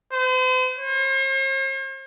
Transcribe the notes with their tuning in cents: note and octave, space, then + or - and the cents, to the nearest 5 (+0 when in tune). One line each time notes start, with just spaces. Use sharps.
C5 -40
C5 +45